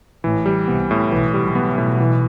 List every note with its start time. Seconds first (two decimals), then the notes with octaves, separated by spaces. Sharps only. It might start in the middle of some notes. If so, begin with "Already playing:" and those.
0.24 A1 A2 E3
0.46 G3
0.68 C2 C3 B3
0.91 A2
1.11 B1 B2 E3
1.34 G3
1.41 B1 B2
1.55 B3
1.70 B1 B2
1.78 A2
2.00 E3